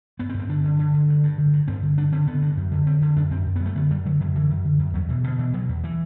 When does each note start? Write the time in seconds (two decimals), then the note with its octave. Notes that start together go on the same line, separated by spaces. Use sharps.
0.19 G2 B3
0.29 C4
0.34 G2
0.39 C4
0.49 D3 D4
0.64 D3
0.79 D3
0.94 D3
1.08 G2
1.23 G2
1.38 D3
1.53 G2
1.68 G2 C4
1.83 D3
1.97 D3 D4
2.12 D3 C4
2.27 D3 B3
2.42 G2
2.57 F#2
2.72 D3
2.87 D3 C4
3.01 D3
3.16 F#2 D4
3.31 F#2 C4
3.46 F#2
3.56 B3
3.61 F#2
3.66 A3
3.75 D3 B3
3.90 F#2 G3
4.05 D3 F#3
4.20 F#2 D3
4.35 D3 E3
4.50 F#2
4.65 D3
4.79 F#2
4.94 E2 F#3
5.09 B2 E3
5.24 B2 D3
5.39 B2 E3
5.53 B2 F#3
5.69 E2
5.84 E3